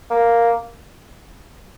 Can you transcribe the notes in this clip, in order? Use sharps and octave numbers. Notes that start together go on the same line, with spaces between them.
A#3